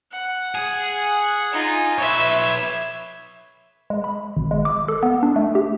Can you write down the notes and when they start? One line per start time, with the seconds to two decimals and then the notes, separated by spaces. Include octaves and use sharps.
0.12 F#5
0.55 G#4
1.53 D#4 F4
1.99 B4 C#5 E5
3.90 G#3
4.04 B5
4.37 G#1
4.51 G#3
4.65 D6
4.88 A4
5.03 B3
5.23 D4
5.36 A3
5.55 G4